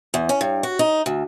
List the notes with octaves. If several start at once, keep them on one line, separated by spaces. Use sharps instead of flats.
E2
C#4
G2
F#4
D#4
D2